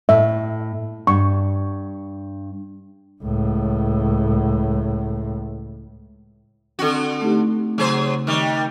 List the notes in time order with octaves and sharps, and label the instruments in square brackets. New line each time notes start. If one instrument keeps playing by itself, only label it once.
[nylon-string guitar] A2 [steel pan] E5
[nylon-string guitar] G2 [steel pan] C#6
[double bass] C#2 A2
[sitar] D3 F#4 [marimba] C4 A4
[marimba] A3 D#4 G4
[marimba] C#3 [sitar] F#3 G#4 C5
[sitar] D#3 G3 [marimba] D#4